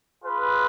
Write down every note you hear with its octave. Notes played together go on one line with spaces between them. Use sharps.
F4 G#4 B4